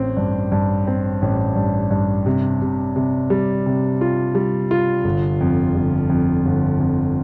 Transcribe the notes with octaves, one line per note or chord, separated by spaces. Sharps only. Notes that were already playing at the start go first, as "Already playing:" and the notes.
Already playing: A1 C4
G2
G2
C4
A1
G2
G2
C3
C3
C3
G3
C3
F4
G3
F4
G1
F2
G1
F2
G1
F2